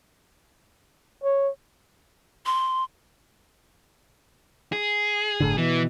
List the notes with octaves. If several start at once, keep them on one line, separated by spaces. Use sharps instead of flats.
C#5
C6
G#4
G1 A2 D3
B2 E3